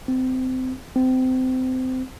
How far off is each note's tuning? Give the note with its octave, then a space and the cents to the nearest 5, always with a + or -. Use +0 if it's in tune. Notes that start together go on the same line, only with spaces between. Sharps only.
C4 -25
C4 -25